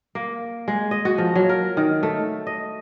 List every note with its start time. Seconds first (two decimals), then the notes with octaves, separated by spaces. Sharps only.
0.15 A#3
0.68 G#3
0.91 D#5
1.05 F#4
1.18 F3
1.35 F#3
1.49 A#4
1.77 D#3
2.03 A3
2.47 D#5